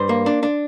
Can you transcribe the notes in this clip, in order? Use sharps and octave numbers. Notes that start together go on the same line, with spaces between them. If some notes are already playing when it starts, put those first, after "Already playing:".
Already playing: G2 C5
A#3
D4
D4